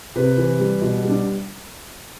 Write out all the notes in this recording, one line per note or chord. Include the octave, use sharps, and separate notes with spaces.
C3 B4
E3
G3
B2
G3
D4